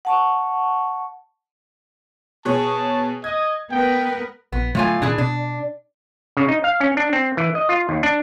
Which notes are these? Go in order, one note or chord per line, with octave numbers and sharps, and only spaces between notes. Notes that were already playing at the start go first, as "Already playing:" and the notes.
F#5 A5 C#6
B2 G#4 C#5 A5
D#5 G#6
B3 A#4 B4 G5
A#1 B3
A2 D3 F#3 A3 F4 G#5
A#2 D#3 D4 E4 G#4
B2 D4
C#3
D#4
F5
C#4
D4
C4
E3
D#5
F4
D#2
D4